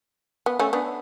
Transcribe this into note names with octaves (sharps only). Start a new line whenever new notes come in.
B3
A3 C#4
B3 D4